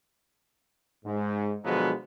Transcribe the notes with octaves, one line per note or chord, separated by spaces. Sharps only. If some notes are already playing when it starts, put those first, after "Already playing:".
G#2
B2 D3 F3 F#3 G#3 B3